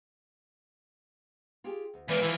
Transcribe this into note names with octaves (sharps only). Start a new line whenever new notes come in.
F4 G4 G#4
D2
E2 G#3 A#3 A#4 B4
E3 F4